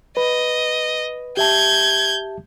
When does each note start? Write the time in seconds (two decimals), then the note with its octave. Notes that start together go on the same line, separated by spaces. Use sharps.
0.17 B4 D#5
1.37 G4 E5 A5 G6 G#6